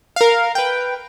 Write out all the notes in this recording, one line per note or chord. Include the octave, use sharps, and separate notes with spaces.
A#4 F5
B4 G5